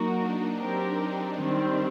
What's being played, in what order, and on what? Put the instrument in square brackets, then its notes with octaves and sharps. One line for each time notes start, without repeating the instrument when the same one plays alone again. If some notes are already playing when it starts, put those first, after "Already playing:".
Already playing: [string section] F#3 A#3 F#4 A#4 [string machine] D#4
[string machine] D4
[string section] F#3 C4 G4 A#4
[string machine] D#4
[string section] D#3 G3 C4 [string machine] D4